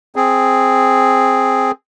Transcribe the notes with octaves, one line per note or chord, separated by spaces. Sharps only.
C4 G#4